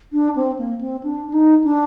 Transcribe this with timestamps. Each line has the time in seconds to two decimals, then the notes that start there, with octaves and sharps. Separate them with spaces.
0.13 D4
0.36 C4
0.59 A#3
0.81 C4
1.03 D4
1.27 D4
1.33 D#4
1.64 D4